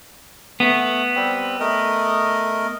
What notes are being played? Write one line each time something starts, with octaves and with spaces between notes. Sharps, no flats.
A3 B3
G3 C4
A3 A#4 D#5